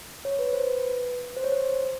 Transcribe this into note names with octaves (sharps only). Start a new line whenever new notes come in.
C#5
B4
C5
B4
C5
C#5
C5